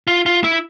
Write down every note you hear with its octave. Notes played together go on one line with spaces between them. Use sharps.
F4
F4
E4